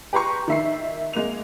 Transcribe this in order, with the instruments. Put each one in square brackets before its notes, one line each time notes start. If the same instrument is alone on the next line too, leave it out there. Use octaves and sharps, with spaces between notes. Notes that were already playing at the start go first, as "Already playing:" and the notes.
[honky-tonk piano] G4 B4 A#5 C6 C#6
D#3 E5 C7
G#3 A#3 F7